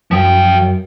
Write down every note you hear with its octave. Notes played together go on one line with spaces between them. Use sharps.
F#2 F3 G5